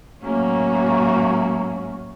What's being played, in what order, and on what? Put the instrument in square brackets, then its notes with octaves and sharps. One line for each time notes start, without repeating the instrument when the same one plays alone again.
[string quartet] A2 F#3 A3 A#3 C#4 F#4